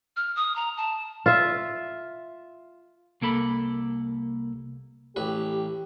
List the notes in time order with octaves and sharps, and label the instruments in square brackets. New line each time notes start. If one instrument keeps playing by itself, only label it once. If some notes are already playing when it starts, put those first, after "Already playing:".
[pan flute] F6
D#6
A#5
A5
[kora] F4 E5
[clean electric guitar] C2 A#3 A4 B5
[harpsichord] A1 B4 [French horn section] G4